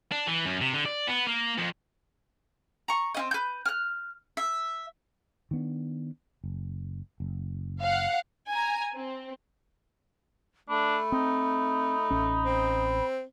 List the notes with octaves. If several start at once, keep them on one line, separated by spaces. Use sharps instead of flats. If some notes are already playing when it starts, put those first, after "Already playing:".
D4
E3
F#2
C3
D3
D5
B3
A#3
F2
A#5 C#6
C4 C#4 D#5
B4 G6
F6 F#6
E5
D#3 B3 D4
F#1
F#1
F5 F#5
G#5 A#5
C4
A3 D4 B5
C4 D#4
A1 C#4
C4